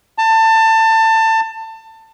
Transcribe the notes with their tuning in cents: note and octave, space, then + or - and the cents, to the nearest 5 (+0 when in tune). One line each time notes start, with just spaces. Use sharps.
A5 +25